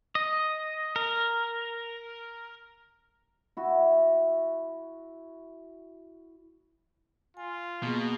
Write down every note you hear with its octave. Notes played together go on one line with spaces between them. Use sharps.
D#5
A#4
E4 F#4
F4 G#5
B2 A#3 G#4